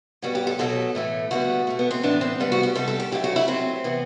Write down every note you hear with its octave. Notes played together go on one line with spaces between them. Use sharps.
A2 G3 B3 F#4
G4
A4
B2 F#3 B3 A4
A2 E3 A3
D3 G3 B3 F#4
B2 A3
B3
C4
A2 E3 B3 D4
C4
C3 G3 B3 D4
F#4
G4
C3 G3 B3 A4
A4
G4
D3 F#3 A3 G4
F#4
E4
C3 F#3 A3 C4
C3 E3 B3